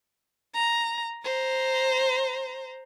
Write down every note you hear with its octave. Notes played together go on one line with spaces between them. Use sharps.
A#5
C5 A#5